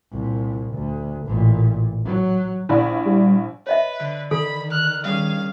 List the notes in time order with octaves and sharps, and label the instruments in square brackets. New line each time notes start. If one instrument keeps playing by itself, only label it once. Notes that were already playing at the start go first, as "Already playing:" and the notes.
[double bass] C2 A#2
D2
A1 A#2
F#3
[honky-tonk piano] A#1 E4 D5
[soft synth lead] G3
[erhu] B4 [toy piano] C#5 D#5 E5
[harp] D3
[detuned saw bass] D#3 [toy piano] A4 [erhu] B5
[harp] F6 [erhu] F#6
[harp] G3 C#4 G#4 [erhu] F5